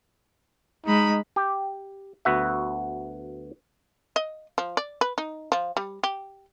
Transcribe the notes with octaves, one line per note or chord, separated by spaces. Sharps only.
G#3 D#4 B5
G4
D2 B3 F#4 E5
D#5
F3
D5
B4
D#4
F3
G3
G4